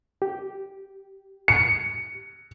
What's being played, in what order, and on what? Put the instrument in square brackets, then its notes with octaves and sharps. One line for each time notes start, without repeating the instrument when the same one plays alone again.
[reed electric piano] G4
[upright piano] C#7